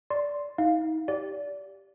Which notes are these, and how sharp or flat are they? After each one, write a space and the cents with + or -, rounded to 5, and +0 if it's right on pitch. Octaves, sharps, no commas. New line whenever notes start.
D5 -10 C6 +0
D#4 +35 F5 +0
G4 +0 D5 -25